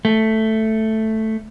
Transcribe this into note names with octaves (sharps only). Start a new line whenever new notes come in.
A3